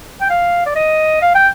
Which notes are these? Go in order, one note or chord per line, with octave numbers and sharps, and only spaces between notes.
G5
F5
D5
D#5
F5
G5